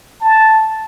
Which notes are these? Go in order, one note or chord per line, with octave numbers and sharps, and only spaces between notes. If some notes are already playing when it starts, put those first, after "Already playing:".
A5